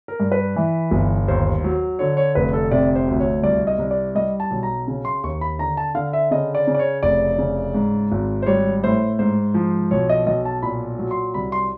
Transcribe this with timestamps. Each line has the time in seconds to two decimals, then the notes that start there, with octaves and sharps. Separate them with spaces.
0.08 A#4
0.20 G2
0.32 B4
0.56 E3
0.91 G1
1.28 D#2 C5
1.64 F#3
1.99 D3 C#5
2.17 C#5
2.35 F1 B4
2.53 A4
2.71 C3 D5
2.95 C5
3.07 D2
3.20 C#5
3.43 C2 D5
3.67 D#5
3.79 C2
3.91 D5
4.15 G3 D#5
4.40 A5
4.51 B1
4.63 A#5
4.88 C#3
5.05 C6
5.24 D#2 C#6
5.41 B5
5.59 D3 A#5
5.77 A5
5.95 D3 F5
6.13 E5
6.31 C#3 D#5
6.55 D5
6.67 C#3
6.75 D5
6.79 C#5
7.03 F1 D5
7.38 C#3
7.75 G#2
8.12 G#1
8.42 C5
8.46 G3 C#5
8.83 A2 C5
9.19 G#2 C5
9.54 F3
9.91 B1 C#5
10.09 D#5
10.26 B1 D#5
10.45 A5
10.63 A#2 B5
10.99 F#3
11.11 C6
11.34 C2 B5
11.52 C6